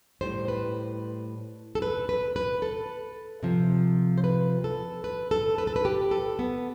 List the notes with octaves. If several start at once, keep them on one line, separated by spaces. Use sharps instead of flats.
A2 G3 C5
B4
A4
B4
B4
B4
A4
C3 F3
C5
B4
A4
B4
A4
B4
A4
B4
G4
A4
B3